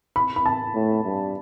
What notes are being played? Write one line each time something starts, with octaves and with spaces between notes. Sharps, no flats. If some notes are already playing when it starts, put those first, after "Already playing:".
B5
B5
A5
A2
G2